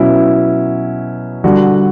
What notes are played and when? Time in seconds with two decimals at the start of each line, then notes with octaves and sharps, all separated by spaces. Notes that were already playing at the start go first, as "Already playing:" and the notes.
Already playing: B2 F#3 C#4 E4
1.44 D3 G3 D4 F#4